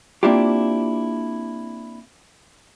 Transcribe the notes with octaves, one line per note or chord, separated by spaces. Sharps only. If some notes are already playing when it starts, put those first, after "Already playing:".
A#3 C4 D4 E4 F4 G4